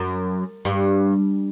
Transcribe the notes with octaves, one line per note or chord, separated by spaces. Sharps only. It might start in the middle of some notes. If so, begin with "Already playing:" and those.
Already playing: F#2
G2